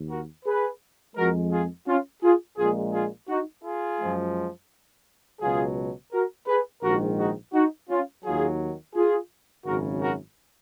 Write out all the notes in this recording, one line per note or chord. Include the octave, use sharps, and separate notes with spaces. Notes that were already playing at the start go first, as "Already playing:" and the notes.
Already playing: D#2
F#4 A#4
G#4 B4
F2 F3 G#3 F#4 A#4
F4 G#4
C#4 F4
F4 G#4
A#1 A#2 G#3 F4 G#4
F4 G#4
D#4 F#4
F4 G#4
F#2 F3 G#3
C#2 B2 F#3 F4 G#4
F#4 A#4
G#4 B4
A#1 G#2 D#3 G#3 F#4 A#4
D#4 F#4
D#4 F#4
C#4 F4
D#2 D#3 F#3 F4 G#4
F4 G#4
G#1 F#2 C#3 F#4 A#4
F#4 A#4